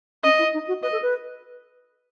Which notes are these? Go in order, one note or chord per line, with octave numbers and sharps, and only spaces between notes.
C#4 D#5
E4
D#4
F#4
B4 D#5
A4
B4